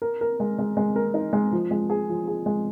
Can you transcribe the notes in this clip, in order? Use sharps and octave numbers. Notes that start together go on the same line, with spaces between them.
A#4
A#4
G#3
G#3
G#3
A#4
D#4
G#3
F3
G#3
G#4
F3
G#4
G#3